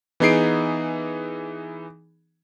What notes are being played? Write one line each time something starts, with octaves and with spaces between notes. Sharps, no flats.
E3 B3 D#4 G#4 C7 D7